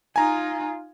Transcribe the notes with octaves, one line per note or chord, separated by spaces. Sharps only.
D#4 F4 G#5 A#5